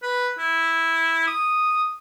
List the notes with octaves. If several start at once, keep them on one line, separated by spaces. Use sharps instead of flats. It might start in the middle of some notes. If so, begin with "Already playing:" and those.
B4
E4
D#6